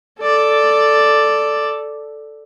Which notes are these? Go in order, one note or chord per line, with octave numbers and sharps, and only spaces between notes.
A4 D5